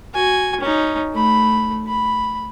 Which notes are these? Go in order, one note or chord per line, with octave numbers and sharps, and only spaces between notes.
F#4 G#5
C#4 D#4
A3 B5
B5